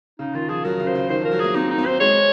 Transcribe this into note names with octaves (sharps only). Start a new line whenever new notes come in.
C#3 D#4
D#3 F4
F3 G#4
F#3 A#4
C#3
C5
C#3
D#3 C5
F3 A#4
F#3
A#3 G#4
C4 D#4
D#4
C4
C5
G#3 C#5